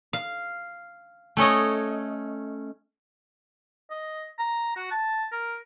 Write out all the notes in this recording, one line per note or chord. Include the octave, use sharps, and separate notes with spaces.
F5
A3 C#4 C#5 D#5
D#5
A#5
F#4
A5
A#4